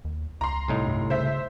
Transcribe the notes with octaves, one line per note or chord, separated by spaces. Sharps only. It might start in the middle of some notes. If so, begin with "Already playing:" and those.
D#2
C#2 A#5 C6
C2 A2 D#4
G2
C#3 C5 E5